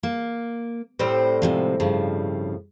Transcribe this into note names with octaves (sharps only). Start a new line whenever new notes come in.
A#3
A2 G3 C4 C5
G#2 C3 F3
G2 C#3 F3